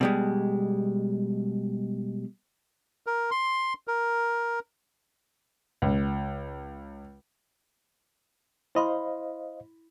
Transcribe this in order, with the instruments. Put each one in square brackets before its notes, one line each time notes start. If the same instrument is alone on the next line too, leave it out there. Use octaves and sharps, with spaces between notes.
[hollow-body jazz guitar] B2 G3 G#3
[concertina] A#4
C6
A#4
[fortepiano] C#2
[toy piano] E4 B5 C6 [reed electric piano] C5 D#5 F5